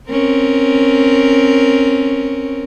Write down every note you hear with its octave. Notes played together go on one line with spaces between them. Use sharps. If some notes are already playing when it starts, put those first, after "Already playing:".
C4 C#4 A#4